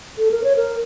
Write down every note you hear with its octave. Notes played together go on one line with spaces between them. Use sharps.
A4
A#4
C#5
A#4